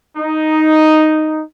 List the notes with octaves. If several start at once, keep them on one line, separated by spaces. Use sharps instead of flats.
D#4